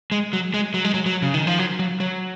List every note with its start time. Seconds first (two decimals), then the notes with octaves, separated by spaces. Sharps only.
0.12 G#3
0.33 F#3
0.54 G#3
0.74 F#3
0.85 G#3
0.94 F#3
1.06 F#3
1.22 C#3
1.34 D#3
1.47 F3
1.59 F#3
1.79 F#3
2.00 F#3